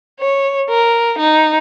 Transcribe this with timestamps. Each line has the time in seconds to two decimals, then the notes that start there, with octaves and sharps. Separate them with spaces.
0.20 C#5
0.69 A#4
1.18 D#4